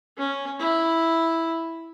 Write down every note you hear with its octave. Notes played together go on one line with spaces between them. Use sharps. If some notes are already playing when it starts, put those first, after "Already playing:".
C#4
E4